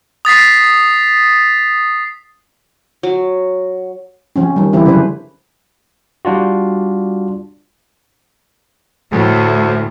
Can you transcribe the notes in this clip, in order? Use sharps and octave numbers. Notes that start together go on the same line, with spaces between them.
D#6 A6 B6 C7
F#3
F3 C4 C#4
D#3 G3
D3 E3 C4 E4 G4
C#3 F#3 C#4 D4 B4 C5
G3 D4 F4 F#4
D2 A2